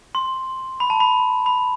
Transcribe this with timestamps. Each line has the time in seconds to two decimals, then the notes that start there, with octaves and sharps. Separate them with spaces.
0.15 C6
0.80 B5
0.90 A5
1.00 B5
1.46 B5